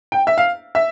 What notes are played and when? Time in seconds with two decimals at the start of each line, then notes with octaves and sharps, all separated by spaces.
0.12 G5
0.27 E5
0.38 F5
0.75 E5